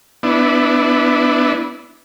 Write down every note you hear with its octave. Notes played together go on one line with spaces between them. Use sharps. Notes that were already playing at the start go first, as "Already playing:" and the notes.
B3 D4 E4